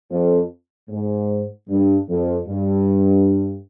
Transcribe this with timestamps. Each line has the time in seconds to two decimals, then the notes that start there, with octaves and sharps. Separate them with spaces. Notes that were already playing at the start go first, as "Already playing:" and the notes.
0.11 F2
0.89 G#2
1.68 G2
2.08 F2
2.47 G2